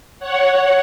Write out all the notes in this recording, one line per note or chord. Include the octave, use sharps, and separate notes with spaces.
C#5 F#5